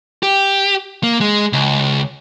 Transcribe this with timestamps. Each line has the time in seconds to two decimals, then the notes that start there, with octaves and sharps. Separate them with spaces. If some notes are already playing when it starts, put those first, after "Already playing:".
0.23 G4
1.03 A#3
1.21 G#3
1.53 C#2